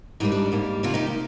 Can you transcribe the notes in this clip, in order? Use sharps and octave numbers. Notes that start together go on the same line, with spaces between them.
G#2 G3 A#3 D#4
D4
G#2 G3 A#3
C3 D#3 A#3 D4 F4
D#4 G4